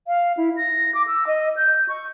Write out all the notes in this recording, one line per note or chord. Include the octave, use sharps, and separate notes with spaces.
F5
E4
A#6
D6
E6
D#5
G6
C#6